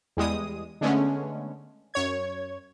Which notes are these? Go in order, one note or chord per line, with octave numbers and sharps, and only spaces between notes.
E2 G3 G#3 D#6
D3 G#3 A3 B3 C#4
F#2 C#5 G#6